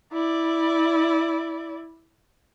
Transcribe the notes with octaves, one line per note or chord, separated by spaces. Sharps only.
E4 D5